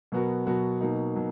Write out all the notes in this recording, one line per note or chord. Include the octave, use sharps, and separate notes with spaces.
B2 F#3 B3 F#4 A#4
B2 F#3 B3 F#4 A#4
B2 F#3 A#3 D#4
B2 F#3